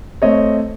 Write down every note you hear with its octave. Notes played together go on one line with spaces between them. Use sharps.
A3 C4 C#5 D#5